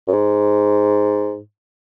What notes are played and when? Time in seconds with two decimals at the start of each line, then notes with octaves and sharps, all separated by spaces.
0.08 F#2
0.13 G#2